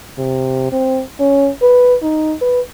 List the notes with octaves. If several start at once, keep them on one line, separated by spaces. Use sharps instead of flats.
C3
C4
C#4
B4
D#4
B4